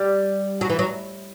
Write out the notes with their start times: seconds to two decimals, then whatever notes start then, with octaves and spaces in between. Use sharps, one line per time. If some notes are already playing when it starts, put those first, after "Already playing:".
Already playing: G3
0.61 F#3
0.70 E3
0.79 F#3